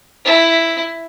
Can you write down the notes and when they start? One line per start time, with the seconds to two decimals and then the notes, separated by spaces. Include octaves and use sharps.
0.25 E4